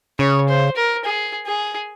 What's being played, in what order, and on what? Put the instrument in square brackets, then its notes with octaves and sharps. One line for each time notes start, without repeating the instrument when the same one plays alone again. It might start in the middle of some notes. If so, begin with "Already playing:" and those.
[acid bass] C#3 [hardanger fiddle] C#5
[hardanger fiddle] C5
A#4
G#4
G#4